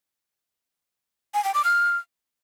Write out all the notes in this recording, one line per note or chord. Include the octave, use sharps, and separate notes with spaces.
G#5
G5
D6
F6